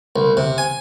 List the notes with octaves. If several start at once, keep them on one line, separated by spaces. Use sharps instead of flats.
C2
C3
G#5